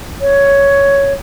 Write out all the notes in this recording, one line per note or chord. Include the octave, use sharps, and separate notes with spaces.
C#5